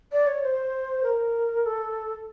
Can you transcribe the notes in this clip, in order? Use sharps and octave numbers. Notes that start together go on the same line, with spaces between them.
D5
C#5
C5
A#4
A4